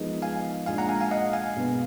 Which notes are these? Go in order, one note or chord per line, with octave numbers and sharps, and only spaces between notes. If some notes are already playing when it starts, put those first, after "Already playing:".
Already playing: F3 G#3 B3 D#4 A#4
F5 G#5
A#2 G#3 D4 G#4 F5 G#5
F#5 A#5
F5 G#5
F5 G#5
D#5 F#5
F5 G#5
B2 G#3 B3